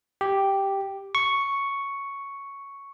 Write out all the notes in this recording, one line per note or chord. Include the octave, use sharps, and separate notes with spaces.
G4
C#6